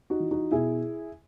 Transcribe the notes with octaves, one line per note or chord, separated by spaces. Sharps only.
D#4 F#4
E3
D#4 F#4
B2 E4 G#4